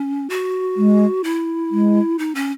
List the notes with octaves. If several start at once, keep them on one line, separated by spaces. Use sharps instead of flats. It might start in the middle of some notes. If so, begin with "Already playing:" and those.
Already playing: C#4
F#4
G#3
E4
G#3
D#4
C#4